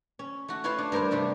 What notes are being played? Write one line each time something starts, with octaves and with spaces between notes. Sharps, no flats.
C#4
A3 F#4
E4 F4 B4 C#5 E5 F5
D4
G2 A#4 C5 F5
G2 C3 G3 A3